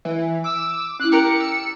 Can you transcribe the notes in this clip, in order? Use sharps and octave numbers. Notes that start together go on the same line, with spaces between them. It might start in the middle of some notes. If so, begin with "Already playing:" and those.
E3 E5
D6 E6
C#4 E4 F#6
G4 A#4 D5 C#7
E6